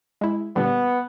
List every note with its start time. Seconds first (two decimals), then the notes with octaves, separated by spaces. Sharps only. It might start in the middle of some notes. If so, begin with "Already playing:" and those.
0.21 G#3 E4
0.56 A#2 D3 G3 B3